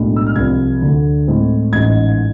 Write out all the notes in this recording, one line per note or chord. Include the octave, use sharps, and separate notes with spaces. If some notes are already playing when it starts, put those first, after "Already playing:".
Already playing: B1 A2 G#3 D4
E6
F6
C2 C3 F3 G#6
D2 D3 A3
A2 G#3 C4
A1 G#2 G#3 G#6